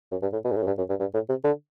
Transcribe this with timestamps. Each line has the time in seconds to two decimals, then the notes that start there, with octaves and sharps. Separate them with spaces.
0.11 F#2
0.22 G2
0.33 A2
0.44 B2
0.51 G2
0.56 A2
0.62 F#2
0.67 G2
0.77 F#2
0.89 G2
1.00 G2
1.14 A2
1.29 C3
1.44 D3